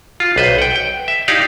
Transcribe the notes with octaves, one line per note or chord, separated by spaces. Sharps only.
F4
B1 B4 C5
F#5 G5
G5
E5
D#4 E4 G4 D5 F5